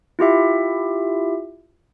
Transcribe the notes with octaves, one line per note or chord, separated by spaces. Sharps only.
E4 F4 G4 E5